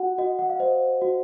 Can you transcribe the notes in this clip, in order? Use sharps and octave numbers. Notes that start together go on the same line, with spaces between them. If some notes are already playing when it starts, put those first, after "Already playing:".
Already playing: F#4 F#5
F#4 D#5
F#5
F5
C5 D#5
F#4